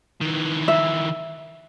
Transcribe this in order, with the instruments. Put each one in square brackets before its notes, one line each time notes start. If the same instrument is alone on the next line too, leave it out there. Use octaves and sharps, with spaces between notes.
[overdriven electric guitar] D#3 E3
[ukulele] E5